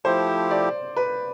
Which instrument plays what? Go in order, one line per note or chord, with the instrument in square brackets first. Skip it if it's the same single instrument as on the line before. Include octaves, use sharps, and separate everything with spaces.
[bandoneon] F3 A3 E4 G4 [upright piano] C5
[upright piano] D5
B4